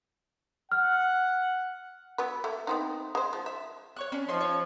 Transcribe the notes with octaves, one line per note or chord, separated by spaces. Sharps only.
F#5 F6
F#3 B3 B4
A3 A#3
B3 C4 D#4
G#3 C5
F3
E5
C#5 C#6 F#6
C#4 D4
F3 D#4 C#5 C6
C#5